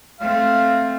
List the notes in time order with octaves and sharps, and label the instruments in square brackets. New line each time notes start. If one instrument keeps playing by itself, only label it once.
[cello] A3 C4 [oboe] F5